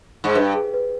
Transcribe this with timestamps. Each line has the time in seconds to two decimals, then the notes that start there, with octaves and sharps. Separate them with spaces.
0.24 G#2
0.35 G2 B4
0.55 G#4
0.74 B4